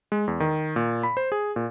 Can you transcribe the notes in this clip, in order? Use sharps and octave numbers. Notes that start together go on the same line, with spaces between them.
G#3
E2
D#3
A#2
B5
C5
G#4
A#2